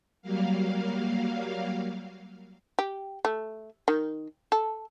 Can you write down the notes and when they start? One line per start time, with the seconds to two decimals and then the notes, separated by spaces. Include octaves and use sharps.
0.22 F#3 G3 A#3 F5
2.79 G4
3.25 A3
3.88 D#3
4.52 A4